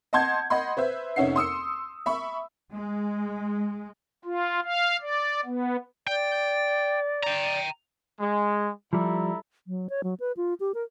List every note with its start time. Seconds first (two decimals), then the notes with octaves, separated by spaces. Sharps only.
0.13 D#5 F#5 A5 C6 G6 G#6
0.50 D#5 F#5 B5 C6
0.77 B4 C5 E5
1.16 F1 C#4 D#4 E5 F#5 C7
1.36 C6 D#6 E6 C#7
2.06 E5 B5 C#6
2.72 G#3
4.25 F4
4.64 F5
5.01 D5
5.45 B3
6.07 D5 G5
7.23 G5 A#5
8.20 G#3
8.93 F3 G3 E4 A4 A#5
9.67 F#3
9.90 C#5
10.04 F#3
10.20 B4
10.37 F4
10.60 G4
10.74 A#4